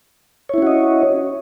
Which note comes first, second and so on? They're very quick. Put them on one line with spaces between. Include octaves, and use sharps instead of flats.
C#5 E4 C#4 F#4 D#5